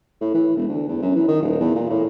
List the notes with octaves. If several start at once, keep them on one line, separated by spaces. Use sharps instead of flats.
A2
E3
E1
D2
E2
F#2
E3
D#3
D#1
E2
A#2
A2